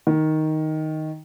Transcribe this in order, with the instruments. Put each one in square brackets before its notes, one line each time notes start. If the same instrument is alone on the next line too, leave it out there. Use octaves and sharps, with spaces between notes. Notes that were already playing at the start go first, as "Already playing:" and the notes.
[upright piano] D#3